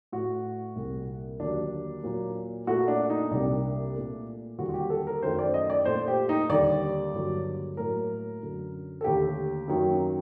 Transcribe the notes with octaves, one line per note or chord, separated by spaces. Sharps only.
A2 A3 F#4
C2 A#2 G3
D#2 D3 F#3 A#3 D4
A#2 F#3 A#3
A#2 A3 F#4
D4
D#4
C2 C3 G3 A#3 D4
A#2 A3
D#2 D3 G3 A#3 F#4
F#4
G4
A4
A#4
F#2 D#3 A3 C5
D5
D#5
D5
A#2 A3 C5
G4
D#4
D#2 D3 G3 A#3 D5
G2 D3 F#3 A#3
A2 F#3 A#3 A#4
F#2 D3 F#3
A4
D#2 D3 A3 G4
F#2 D#3 F#3 A#3